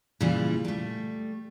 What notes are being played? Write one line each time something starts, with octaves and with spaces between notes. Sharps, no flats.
A#2 C#3 E3 G3 E4
G3 A3